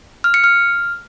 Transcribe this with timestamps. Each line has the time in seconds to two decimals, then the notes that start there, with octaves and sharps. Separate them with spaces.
0.24 F6
0.34 C#7
0.44 F6